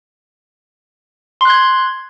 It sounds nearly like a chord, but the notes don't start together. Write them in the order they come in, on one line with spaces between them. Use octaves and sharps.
C6 F#6 G#6